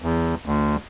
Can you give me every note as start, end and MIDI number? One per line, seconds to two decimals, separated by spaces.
0.02 0.35 40
0.46 0.76 38